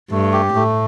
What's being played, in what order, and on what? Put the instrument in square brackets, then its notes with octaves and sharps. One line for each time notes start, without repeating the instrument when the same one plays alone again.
[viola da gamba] G2 [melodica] A3
[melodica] G4
[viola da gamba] A2 [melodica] A3